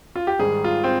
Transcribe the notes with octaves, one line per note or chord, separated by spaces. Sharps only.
F4
G4
G#2 D#3 G3 G#4
F4
C4